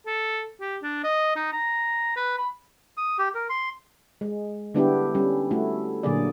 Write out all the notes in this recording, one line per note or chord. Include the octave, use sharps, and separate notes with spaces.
A4
G4
D4
D#5
D#4
A#5
B4
B5
D#6
G4
A#4
C6
G#3
D3 G3 B3 D4 E4 G4
G3 C#4
A3 E4 F#4
A#2 D3 F#3 A#3 G#4 D5